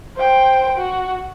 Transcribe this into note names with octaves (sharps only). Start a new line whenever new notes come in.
C5 G5
F#4